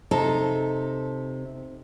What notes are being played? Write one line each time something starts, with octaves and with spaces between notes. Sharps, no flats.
C3 D#4 A4